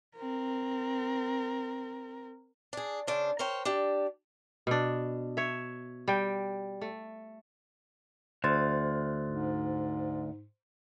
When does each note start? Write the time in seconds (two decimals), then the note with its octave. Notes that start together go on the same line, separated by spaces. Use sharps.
0.17 C4 A#4
2.73 D4 G#4
3.07 C#3 D4 C5
3.39 A#4 C5 C#5 G5
3.65 D4 G4 D5
4.67 B2 D4
5.37 C#5 E5
6.08 G3 G5
6.81 A3
8.44 D2 C5 C6 A6
9.29 G#2